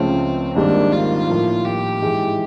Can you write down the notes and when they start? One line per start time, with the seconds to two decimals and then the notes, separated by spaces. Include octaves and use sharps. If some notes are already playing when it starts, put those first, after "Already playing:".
Already playing: C#2 C#3 F3 A3 C4 C#4
0.56 G#1 G#2 D#3 G3 A#3 D4
0.92 F4
1.29 A2 F3 A#3
1.66 G4
2.02 G#2 E3 G#3